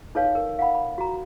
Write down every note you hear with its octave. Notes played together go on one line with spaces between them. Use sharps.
D#4 A4 B4 C#5 F5
A#4
F5 F#5 B5
B5
F#4 A#5